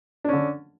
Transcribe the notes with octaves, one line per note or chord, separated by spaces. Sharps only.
D3 C#4 D4